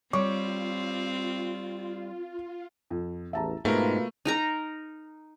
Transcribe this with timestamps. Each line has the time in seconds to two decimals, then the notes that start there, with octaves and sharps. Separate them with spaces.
0.13 G3 C4 F4 C#5 C#6 D6
2.90 F2
3.33 A1 E2 E5 A5 A#5
3.65 G#2 B2 A3 A#3 F4 A#4 B4
4.25 D#4 A#4 A#5